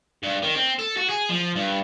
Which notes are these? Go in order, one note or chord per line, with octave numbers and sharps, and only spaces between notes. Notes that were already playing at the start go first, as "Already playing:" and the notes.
G2
D#3
C4
A4
F#4
G#4
F3
G2